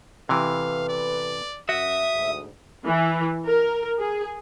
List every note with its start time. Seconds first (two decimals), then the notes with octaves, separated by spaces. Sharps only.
0.29 E2 C3 E3 A4 B4 F5
0.89 D5
1.69 F#2 F#4 E5 D#6
2.13 D2 G#2
2.85 E3
3.45 A#4
3.99 G#4